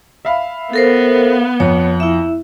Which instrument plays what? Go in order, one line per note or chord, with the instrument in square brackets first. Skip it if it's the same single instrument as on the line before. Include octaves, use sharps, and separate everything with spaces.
[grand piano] E5 F5 B5
[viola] B3 [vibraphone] A4 A#4 C5
[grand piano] F2 [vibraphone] C#5
[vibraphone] E4 E5